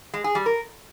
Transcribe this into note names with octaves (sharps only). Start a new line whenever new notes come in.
G#3
G#4
G3
A#4